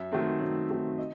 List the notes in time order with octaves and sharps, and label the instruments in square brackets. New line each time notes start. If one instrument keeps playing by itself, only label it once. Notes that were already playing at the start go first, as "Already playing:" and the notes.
Already playing: [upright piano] F#2 E5
D#3 F#3 A3 C4
F#2
D#3 F#3 A3 C4
D#5